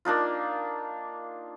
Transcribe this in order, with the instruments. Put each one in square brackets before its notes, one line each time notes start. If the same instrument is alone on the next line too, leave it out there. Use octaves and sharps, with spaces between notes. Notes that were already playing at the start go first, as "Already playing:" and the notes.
[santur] A#3 D4 D#4 F4